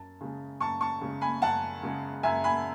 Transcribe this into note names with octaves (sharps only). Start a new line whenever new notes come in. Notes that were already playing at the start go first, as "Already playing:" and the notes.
Already playing: F#2 A5
C#3 G#3
F#2 A5 C#6
A5 C#6
C#3 G#3
G#5 B5
F#2 F#5 A5
C#3 G#3
F#2 E5 G#5
G#5 B5